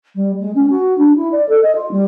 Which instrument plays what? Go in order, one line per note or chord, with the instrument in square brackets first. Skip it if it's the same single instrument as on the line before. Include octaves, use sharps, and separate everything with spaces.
[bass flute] G3
G#3
C#4
F#4
D4
E4
D5
A4
D#5
F4
G3